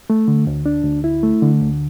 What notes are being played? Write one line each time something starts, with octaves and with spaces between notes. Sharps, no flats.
A3
D3
D2
D4
D2
E4
A3
D3
D2